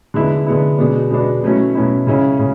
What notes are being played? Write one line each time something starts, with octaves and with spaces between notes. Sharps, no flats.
D3 G#3 B3 E4
D3 G#3 B3 E4
B2 G#3 B3 D4
B2 G#3 B3 D4
B2 F#3 A3 C#4 E4
B2 F#3 A3 C#4 E4
C#3 G#3 C#4 E4
C#3 G#3 C#4